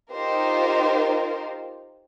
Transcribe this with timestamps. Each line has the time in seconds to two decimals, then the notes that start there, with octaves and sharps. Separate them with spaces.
0.12 D#4 F4 G4 A#4 C5